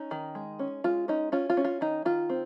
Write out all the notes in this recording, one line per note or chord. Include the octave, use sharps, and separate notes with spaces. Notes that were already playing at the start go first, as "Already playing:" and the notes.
Already playing: C#4 D#4
D#3
G#3
C#4
G#3 F4
C#4 D#4
C#4 F4
F4
C#4
F4
D#3 D#4
D#3 F4
C4